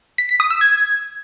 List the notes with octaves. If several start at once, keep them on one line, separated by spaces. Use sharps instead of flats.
B6
B6
D#6
E6
G#6